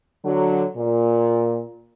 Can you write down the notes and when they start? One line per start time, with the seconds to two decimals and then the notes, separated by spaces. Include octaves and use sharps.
0.24 D3 F#3
0.76 A#2